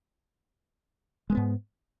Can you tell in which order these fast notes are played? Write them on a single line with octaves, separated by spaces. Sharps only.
G#3 A#3 B3 G#2